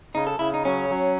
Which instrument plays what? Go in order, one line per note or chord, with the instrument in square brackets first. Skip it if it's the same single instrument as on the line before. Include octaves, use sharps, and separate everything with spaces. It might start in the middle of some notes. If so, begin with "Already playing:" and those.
[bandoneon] C#3 [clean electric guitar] D#4
[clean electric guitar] A4
[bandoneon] C#3 [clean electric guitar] E4
[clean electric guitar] D#4
[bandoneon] F#3 [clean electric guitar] C#4
[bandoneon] F#3